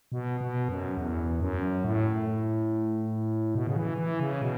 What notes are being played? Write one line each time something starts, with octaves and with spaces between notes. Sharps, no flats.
B2
B2
F#2
E2
F#2
A2
B2
C#3
E3
E3
C#3
B2